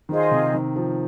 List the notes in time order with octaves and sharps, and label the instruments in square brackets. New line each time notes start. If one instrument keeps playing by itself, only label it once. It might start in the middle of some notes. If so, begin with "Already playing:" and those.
[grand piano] D#3 [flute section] F4 G#4 C5 D#5
[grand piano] C3
D#3
F3